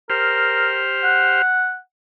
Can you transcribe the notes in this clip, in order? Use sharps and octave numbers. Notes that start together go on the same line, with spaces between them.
G4 A#4 C5 F6
F#5